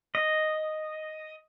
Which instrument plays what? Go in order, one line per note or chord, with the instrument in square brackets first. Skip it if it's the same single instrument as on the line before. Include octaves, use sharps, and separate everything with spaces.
[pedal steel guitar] D#5